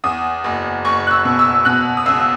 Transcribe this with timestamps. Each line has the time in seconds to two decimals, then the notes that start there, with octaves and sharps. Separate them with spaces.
0.04 E2 D#6
0.44 F#1
0.85 F#1 C#6
1.07 F#6
1.11 E6
1.25 B2
1.39 E6
1.65 B2 F#6
1.97 D#6
2.06 C#2 E6